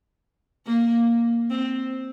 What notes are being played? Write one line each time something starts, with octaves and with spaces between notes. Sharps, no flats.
A#3
C4